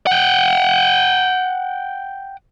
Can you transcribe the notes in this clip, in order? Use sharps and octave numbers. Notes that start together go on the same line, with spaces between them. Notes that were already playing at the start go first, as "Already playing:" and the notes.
F#5 G5